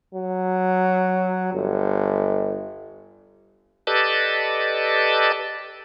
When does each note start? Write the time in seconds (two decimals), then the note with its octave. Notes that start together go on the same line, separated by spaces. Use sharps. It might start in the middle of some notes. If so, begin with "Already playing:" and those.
0.14 F#3
1.54 G1
3.87 G4 A4 B4 D5 D#5 A5